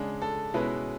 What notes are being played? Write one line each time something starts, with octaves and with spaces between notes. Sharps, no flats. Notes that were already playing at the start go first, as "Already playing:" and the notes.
Already playing: C#3 G#3 D4
A4
B2 G#3 C#4 E4 B4